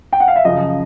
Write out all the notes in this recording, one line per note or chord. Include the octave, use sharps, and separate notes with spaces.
G5
F#5
F5
E5
F#2 C#3 F3 D#5